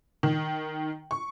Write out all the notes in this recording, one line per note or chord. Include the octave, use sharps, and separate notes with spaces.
D#3
C#6